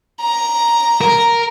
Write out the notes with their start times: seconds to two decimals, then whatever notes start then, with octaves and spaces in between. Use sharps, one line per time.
0.21 A#5
1.01 A#4